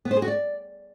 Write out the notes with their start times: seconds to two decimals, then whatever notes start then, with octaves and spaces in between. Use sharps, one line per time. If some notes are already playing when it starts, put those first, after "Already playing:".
0.05 B3
0.11 C5
0.17 G#4
0.22 F#4
0.28 D5